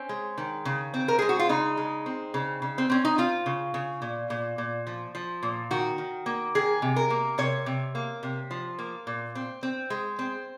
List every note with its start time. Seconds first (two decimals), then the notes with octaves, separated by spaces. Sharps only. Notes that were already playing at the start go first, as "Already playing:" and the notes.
Already playing: C4 C#4
0.09 G#3
0.38 D#3
0.65 C#3
0.94 C4
1.08 A#4
1.19 G#3 G#4
1.29 F#4
1.39 F4
1.49 C#3 D#4
1.77 G#3
2.06 C4
2.34 C#3
2.62 C#3
2.78 C4
2.90 C4 C#4
3.05 D#4
3.18 C4 F4
3.46 C#3
3.74 C#3
4.02 A#2
4.30 A#2
4.58 A#2
4.87 F3
5.15 F3
5.43 A#2
5.71 D#3 F#4
5.98 D#3
6.26 A#3
6.55 D#3 G#4
6.82 C3
6.96 A#4
7.10 A#3
7.38 C3 C#5
7.66 C3
7.95 A#3
8.23 C3
8.51 F3
8.79 A#3
9.07 A#2
9.35 C4
9.63 C4
9.90 G#3
10.19 C4